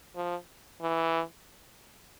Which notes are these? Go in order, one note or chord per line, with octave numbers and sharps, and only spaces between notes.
F3
E3